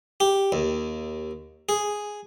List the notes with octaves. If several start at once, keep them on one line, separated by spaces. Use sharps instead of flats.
G4
D#2
G#4